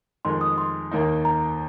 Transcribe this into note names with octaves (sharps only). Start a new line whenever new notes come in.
F2 D#3 G#3 C6
D#6
C6
D#2 D#3 A#3 D#4
A#5